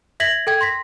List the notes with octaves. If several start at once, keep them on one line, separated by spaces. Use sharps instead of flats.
E5 G#6 A#6 B6 F#7
A4 G5 G#6
C6 A#6 B6